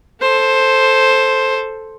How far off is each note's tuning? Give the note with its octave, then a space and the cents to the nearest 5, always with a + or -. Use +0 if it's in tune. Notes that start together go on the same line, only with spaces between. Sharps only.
A4 +0 C5 +5